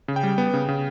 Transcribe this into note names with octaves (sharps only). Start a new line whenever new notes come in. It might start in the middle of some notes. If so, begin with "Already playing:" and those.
C#3
G5
G3
B3
C#3
C#3